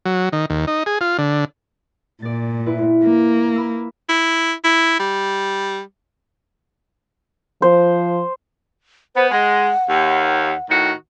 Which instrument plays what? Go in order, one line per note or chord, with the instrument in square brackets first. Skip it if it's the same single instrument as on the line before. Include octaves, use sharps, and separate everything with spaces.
[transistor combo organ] F#3
D#3
D#2
D#4
G#4
F4
D3
[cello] A#2 [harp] D5 A6
[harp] E4 F4 B4
[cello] A#3
[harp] B5 E6
[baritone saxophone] E4
E4
G3
[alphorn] F3 [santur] C5
[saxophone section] B3 [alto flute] C5
[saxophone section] G#3 [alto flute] F#5
[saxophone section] D#2
A2 D#3 F#4